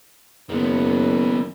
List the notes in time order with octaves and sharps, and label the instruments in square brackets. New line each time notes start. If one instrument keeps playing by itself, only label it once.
[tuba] F#1 [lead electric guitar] D#3 B3